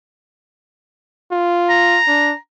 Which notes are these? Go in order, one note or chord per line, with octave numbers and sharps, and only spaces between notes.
F4
A#5
D4